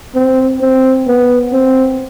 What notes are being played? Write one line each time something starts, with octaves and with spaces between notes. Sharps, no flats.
C4
C4
B3
C4